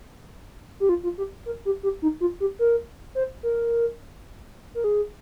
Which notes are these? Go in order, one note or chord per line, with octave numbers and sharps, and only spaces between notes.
G4
F4
F4
G4
A#4
G4
G4
D#4
F4
G4
A#4
C5
A#4
A#4
G#4